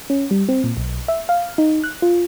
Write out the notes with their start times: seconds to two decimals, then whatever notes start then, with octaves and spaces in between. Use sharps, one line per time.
0.10 C#4
0.31 G3
0.49 C4
0.64 A#2
0.77 B1
1.08 E5
1.29 F5
1.58 D#4
1.84 F#6
2.02 F4